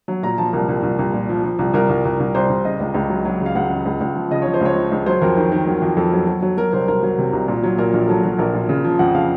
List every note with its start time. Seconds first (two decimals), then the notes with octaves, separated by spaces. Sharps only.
0.08 F#3
0.23 A#2 A#5
0.38 F3 A5
0.53 C2 A#4
0.68 C2
0.83 C2
0.99 C2
1.13 A#2
1.29 F3
1.44 F3
1.59 C2
1.74 C2 A#4
1.89 C2
2.05 C2
2.20 C2
2.35 C2 C5
2.49 C2
2.65 C#3 D#5
2.80 C#2
2.94 C#2
3.10 F#3
3.25 F#3
3.40 C#3
3.46 F5
3.55 C#2 F#5
3.70 C#3
3.86 C#2
4.01 C#2
4.16 F3
4.31 C#3 D#5
4.42 F3 C#5
4.54 C5
4.61 C#2 C#5
4.76 F3
4.92 C#2
5.06 F#3 C5
5.22 F2 A#4
5.37 D#3
5.52 D#3
5.67 F#3
5.82 F2
5.97 F2 A4
6.13 F#3
6.27 F#3
6.42 F#3
6.58 F#3 A#4
6.73 C2 C5
6.88 C2 A#4
7.03 F#3
7.18 C3
7.33 C2
7.48 A#2
7.63 F#3
7.78 A#2 A#4
7.93 A#1
8.08 F#3 A4
8.24 F#3
8.39 A#1 A#4
8.54 A#2
8.69 C#3
8.84 F3
8.99 F2 F#5
9.14 C#3 F5